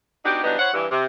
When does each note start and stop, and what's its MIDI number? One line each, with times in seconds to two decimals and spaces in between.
0.24 0.42 59
0.24 0.42 62
0.24 0.42 63
0.24 0.42 66
0.24 0.42 67
0.44 0.55 52
0.44 0.55 54
0.44 0.55 55
0.44 0.55 59
0.44 0.55 62
0.44 0.55 63
0.58 0.70 64
0.58 0.70 72
0.58 0.70 73
0.58 0.70 78
0.73 0.86 43
0.73 0.86 52
0.91 1.04 48